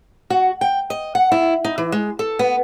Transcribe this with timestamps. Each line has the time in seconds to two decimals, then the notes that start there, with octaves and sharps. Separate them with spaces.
0.30 F#4
0.61 G5
0.90 D#5
1.15 F#5
1.32 E4
1.64 D#4
1.78 E3
1.92 G#3
2.19 A4
2.39 B3